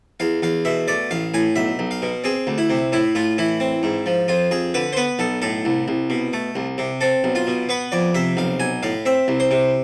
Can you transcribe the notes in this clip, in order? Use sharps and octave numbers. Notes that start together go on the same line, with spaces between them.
E2 F5
E2 F5
B2 E5
A3 D5
A1 F5
A2 G#5
B1 E5
B1
F5
B2
C4 G#4
D2
E4
C3
A2 E4
A2 F4
E3 E4
C4
G#2
F3
F2 F4
F2 G#4
D3 B4
C5
B3 B4
B1 A4
A2 A4
C2
C2
B2
A3
C2
C3
C4 A4
B1
F4
B2
B3 B4
F2 D5
C3 E5
B1 F5
B1 G#5
A2 F5
C4 E5
C2
C5
C3